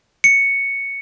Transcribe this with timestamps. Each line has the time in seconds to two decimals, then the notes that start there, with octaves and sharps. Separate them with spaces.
0.24 C#7